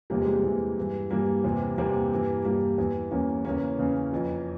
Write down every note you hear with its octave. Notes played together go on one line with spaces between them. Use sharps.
E2 C3 E3 G3 A#3
G#3
G3
E2 C3 E3
G2 E3
G2 E3 G3 A#3
E2 C3 E3
E2 C3 E3 G3 A#3
G2 E3
G2 E3 G3 A#3
E2 E3
E2 E3 A#3 C#4
E2 C#3 E3 A#3 C#4
E2 C#3 E3
F2 E3